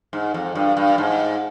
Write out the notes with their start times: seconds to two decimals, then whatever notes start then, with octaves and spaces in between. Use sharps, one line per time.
0.13 G#2
0.34 F2
0.55 G2
0.77 G2
0.98 G#2